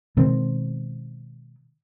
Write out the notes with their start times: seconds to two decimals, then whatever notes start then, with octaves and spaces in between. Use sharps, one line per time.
0.17 B2 D#3 G#3 C4